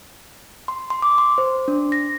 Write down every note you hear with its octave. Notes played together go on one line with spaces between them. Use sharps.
C6
C6
D6
C6
C5
D4
A#6